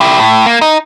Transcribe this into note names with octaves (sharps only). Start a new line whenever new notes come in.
E4 G4
A2
A#3
D#4